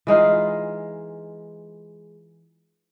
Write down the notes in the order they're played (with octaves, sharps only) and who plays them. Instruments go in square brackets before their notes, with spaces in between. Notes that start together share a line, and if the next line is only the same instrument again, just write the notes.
[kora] E3 G#3 D#4 F4